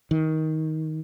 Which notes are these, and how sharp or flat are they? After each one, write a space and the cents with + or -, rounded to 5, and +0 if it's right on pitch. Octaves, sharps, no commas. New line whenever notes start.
D#3 +15